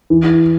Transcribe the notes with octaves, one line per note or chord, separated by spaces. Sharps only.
E3